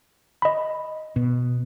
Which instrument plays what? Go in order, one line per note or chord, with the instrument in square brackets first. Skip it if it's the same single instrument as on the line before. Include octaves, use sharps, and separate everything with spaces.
[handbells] D#5 B5
[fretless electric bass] B2